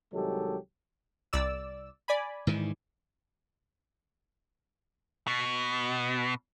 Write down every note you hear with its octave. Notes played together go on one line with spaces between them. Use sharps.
C2 D#3 F#3 G#3 G4 A4
C2 D5 E6
D5 G#5 B5
G#2 D#3 E3
B2